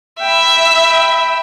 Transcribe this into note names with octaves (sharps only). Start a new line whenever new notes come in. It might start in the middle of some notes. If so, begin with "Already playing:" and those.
E5 G5 B5